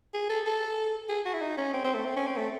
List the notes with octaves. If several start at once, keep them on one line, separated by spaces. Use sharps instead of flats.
G#4
A4
A4
G#4
F#4
E4
D#4
C#4
C4
C4
A3
C4
C#4
C4
A3